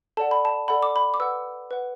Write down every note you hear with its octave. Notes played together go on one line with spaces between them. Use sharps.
A4 D5 F#5 A5
B5
A5
A4 D5 F#5 B5
D6
B5
D6
B4 F#5 E6
B4 F#5